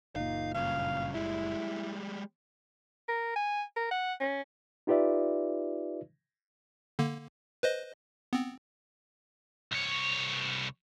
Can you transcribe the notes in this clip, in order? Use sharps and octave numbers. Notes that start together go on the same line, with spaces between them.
F#1 A#2 D#4 F5
G2 C#3 F5
G3 G#3 E4
A#4
G#5
A#4
F#5
C#4
D#4 F4 G4 B4 D5 E5
D3 A#3
B4 C5 D#5
B3 C4
C2 C#5